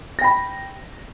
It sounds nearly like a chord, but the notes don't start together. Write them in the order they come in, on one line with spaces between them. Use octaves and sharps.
A#6 G5 B5